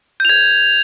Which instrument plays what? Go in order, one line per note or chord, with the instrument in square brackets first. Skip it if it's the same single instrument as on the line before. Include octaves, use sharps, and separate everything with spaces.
[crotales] G6
F7
G#6